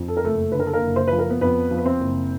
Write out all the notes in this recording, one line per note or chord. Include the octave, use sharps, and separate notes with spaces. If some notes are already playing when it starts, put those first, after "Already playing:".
Already playing: F2
A4
A#4
F#1 A3 A4
D3 B4
A#4
A4
A#3 A#4
F#1
C5
F3 B4
A#4
B3 B4
F2 B3 B4
F3
B4
C4 C5
F#1